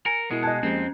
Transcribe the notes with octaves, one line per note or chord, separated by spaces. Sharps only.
A#4 G#5 C#7
B2 G#3 E4 A#4
D#5 G#5 A5 F#6 G#6
F2 F3 G#3 A#3 C4 C#4